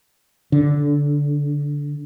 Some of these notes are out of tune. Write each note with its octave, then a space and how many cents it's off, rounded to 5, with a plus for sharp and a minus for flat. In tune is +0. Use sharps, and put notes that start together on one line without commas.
D3 -15